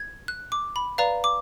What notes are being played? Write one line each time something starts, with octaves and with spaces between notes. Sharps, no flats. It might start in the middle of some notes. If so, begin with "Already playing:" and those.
Already playing: G#6
F#6
D6
B5
B4 D5 F5 A#5
D6